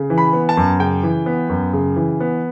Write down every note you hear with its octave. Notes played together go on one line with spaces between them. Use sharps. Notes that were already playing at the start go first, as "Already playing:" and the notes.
Already playing: C#3
E3
B5
B3
A5
F#2
C#3 G5
E3
B3
F#2
C#3
E3
B3